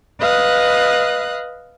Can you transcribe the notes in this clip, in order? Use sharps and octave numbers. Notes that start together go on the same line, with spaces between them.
B4 D#5 F5 D#6 F#6